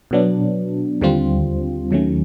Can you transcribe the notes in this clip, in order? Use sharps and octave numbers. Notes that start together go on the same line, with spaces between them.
B2 F#3 B3 D4
D#2 D3 G3 C4 F4
D#2 D#3 F#3 A3 C#4